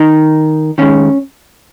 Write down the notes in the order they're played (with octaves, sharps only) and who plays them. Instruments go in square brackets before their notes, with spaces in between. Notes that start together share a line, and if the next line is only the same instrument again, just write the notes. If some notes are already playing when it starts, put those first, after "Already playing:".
Already playing: [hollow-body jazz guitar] D#3 D#4
D#3 G#3 C#4